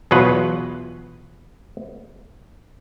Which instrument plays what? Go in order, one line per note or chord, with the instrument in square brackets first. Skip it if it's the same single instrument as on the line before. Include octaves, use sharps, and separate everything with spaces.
[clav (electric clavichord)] E2 B2 F#3 F4 B4 F#5